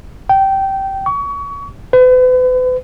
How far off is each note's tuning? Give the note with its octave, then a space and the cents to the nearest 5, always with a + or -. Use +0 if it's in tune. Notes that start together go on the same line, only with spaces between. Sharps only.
G5 -15
C#6 +30
B4 +40